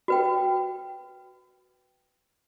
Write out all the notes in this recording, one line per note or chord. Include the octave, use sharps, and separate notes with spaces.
F#4 B4 G5